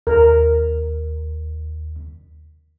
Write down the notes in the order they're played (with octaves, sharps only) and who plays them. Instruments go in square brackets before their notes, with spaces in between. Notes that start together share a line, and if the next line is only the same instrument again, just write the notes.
[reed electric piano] D#2 [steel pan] A#4